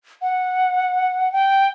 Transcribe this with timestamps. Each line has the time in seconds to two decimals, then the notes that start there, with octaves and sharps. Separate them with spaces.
0.22 F#5
1.32 G5